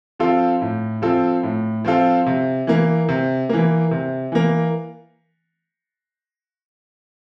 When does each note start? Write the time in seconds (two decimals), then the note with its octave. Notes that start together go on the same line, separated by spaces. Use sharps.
0.19 F3 C4 F4 A4
0.61 A2
1.02 F3 C4 F4 A4
1.43 A2
1.85 F3 C4 F4 A4
2.26 C3
2.67 E3 A#3
3.09 C3
3.49 E3 A#3
3.91 C3
4.32 E3 A#3